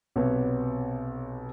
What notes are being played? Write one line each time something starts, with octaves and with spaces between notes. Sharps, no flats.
B1 C3 B3 B4 C#5